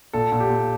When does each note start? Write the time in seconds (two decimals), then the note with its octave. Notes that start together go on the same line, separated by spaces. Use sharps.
0.13 A#2 A4
0.32 A#2
0.40 G4
0.50 A#2